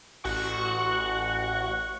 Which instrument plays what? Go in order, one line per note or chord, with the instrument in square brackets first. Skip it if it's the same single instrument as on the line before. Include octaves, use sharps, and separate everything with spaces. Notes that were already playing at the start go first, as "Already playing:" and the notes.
[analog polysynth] A1 F#4 F#5 C#6